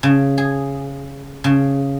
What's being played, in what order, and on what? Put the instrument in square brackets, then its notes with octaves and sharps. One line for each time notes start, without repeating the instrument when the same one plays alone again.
[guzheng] C#3
G#4
C#3